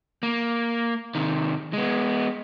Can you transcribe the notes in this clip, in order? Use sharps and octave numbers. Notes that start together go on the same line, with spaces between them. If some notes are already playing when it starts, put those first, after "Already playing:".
A#3
C3 D#3
G#3 B3